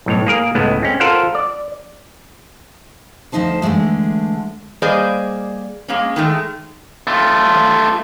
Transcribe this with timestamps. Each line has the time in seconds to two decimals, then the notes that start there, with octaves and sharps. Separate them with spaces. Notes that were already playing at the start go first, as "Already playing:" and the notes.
0.06 B1 A2 C#5
0.27 A#3 G#4 A#4
0.55 C#2 A2 G#3 A3 B3
0.83 C4 C#4
1.00 F4 A4 A#4 C5 F5 F#5
1.35 D5
3.32 D2 G#2 F3 D#4 C5 A5
3.62 D3 E3 F3 G#3 A3
4.82 G3 A#3 G#4 C5 D5 D#5
5.88 G#3 A#3 C#4
6.16 D#3 G#3 A3
7.07 A3 F4